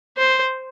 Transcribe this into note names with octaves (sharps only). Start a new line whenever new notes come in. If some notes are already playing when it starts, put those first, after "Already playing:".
C5